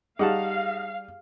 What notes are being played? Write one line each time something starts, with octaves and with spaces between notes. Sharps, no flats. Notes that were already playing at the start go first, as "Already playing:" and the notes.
G3 D#4 G4 G#4 F5 F#5 A5